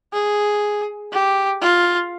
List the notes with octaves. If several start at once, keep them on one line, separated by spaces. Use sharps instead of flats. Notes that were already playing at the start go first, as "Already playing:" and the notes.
G#4
G4
F4